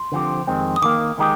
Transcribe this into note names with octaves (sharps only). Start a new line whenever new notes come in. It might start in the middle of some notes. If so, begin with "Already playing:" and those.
Already playing: C6
D3 F3 C4 G4
F2 D#3 G#3 C4
D#6
D#3 G3 A#3 D6
D#3 G#3 D#4 G4